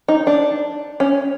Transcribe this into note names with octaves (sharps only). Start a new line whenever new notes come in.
D#4
D4
C#4